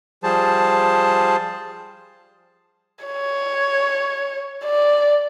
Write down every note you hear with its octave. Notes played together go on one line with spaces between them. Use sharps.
F3 G3 G#4 C5 A5
C#5
D5